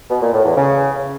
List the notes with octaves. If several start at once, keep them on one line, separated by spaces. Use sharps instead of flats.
B2
A#2
A2
E2
C#3